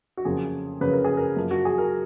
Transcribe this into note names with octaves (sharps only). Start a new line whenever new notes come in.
F#4
F2 C#3 F#3 A#3 G#4
F2 C#3 F#3 A#3 B4
A#4
G#4
A#4
F#2 F3 A#3
F#4
G#4
A#4